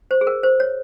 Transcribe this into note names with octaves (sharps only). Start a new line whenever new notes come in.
C5
G#4
A#4
C5
C#5